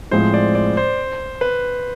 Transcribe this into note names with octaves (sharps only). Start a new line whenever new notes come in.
A2 F3 G#3 C4 C5
D5
D5
C5
B4